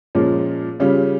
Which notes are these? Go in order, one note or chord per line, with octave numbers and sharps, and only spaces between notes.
A#2 F3 G#3 C#4
C#3 G3 C#4 F4